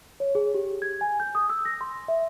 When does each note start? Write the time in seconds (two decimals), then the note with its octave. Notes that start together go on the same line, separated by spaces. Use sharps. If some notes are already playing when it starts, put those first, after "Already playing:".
0.20 C#5
0.35 G#4
0.54 G4
0.82 G#6
1.01 G#5
1.20 G6
1.35 D#6
1.50 E6
1.65 A#6
1.81 C6
2.08 E5